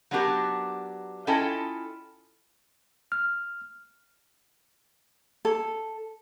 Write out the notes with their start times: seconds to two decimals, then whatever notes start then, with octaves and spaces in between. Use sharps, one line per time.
0.11 F#3 B3 D4 F#4 G4 A#4
1.27 C#4 E4 F4 A4 D#5 G5
3.12 F6
5.45 A4